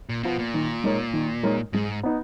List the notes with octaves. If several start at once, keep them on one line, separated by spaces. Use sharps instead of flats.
A#2
B2 F3 B3 F4
A#2
D#3
G#3 D#4 A#4 C#5
D#3
G#3 D#4 A#4 C#5
G#2 G#3
B3 D#4